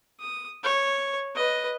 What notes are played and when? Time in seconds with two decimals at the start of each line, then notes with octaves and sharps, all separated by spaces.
0.20 D#6
0.64 C#5
1.35 B4 D#5